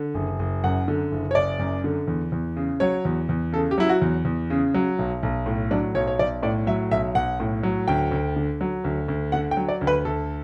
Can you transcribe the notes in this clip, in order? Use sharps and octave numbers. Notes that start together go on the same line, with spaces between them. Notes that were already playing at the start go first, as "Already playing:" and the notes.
Already playing: D3
F#1
F#1
F#2 F#5
D3
F#1
C#5
F#1 D5
F#2
D3
E2
E2
C#3
F#3 C#5
E2
E2
C#3 A4
G4
F#3 E4
F#4
E2
E2
C#3
F#3
B1
B1
A2
F#3 D4
B1 C#5
C#5
B1 D5
A2 D5
F#3 E5
B1 E5
B1 F#5
A2
F#3
D2 G5
D2
D3
F#3
D2
D2
D3 F#5
G5
F#3
D5
D2
B4
D2 A4